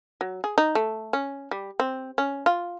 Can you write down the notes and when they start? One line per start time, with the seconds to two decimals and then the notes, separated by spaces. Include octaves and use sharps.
0.21 F#3
0.44 G#4
0.58 D#4
0.75 A3
1.13 C#4
1.51 G3
1.80 C4
2.18 C#4
2.46 F4